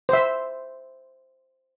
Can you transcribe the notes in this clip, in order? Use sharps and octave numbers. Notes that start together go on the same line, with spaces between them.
C5 E5